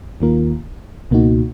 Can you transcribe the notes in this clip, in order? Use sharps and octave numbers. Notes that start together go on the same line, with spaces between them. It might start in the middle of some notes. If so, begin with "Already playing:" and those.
D#2 D#3 A#3 F4 A#4
C#2 B2 A#3 D#4 F#4